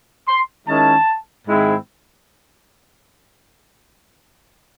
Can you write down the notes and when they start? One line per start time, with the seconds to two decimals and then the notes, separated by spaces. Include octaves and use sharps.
0.28 C6
0.68 D#3 G#3 C#4 E4 A5
1.47 G#2 D#3 G#3 C4 E4